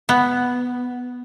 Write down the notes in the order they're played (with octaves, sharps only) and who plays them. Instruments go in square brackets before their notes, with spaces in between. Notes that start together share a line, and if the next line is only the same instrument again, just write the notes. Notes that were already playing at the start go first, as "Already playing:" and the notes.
[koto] B3